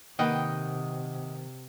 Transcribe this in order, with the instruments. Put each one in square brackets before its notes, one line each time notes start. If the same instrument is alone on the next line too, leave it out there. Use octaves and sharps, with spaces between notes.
[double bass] C3 [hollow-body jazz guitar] D#3 A#3 B4 [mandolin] D#5 F#5 G5